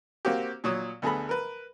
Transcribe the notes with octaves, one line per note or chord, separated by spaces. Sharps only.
A#3 C4 F#4 G4
A#2 F#3 C#5 D#6
D2 B3 G#4 A4 B5
A#4 B4